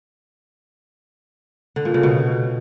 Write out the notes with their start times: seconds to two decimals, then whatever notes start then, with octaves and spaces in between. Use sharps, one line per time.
1.76 D3
1.85 A#2
1.94 C#3
2.03 B2